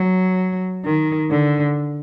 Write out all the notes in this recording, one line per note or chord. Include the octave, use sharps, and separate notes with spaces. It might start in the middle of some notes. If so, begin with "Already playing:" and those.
Already playing: F#3
D#3
D3